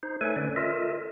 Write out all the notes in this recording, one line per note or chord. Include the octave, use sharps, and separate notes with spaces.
D#4 C5
A3 A4 B4 C#5 G#5
D3 C#4 B4 D5
F4 A4 A#4 D#5 E5